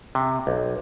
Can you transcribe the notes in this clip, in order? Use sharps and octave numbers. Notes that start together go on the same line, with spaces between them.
C3
B1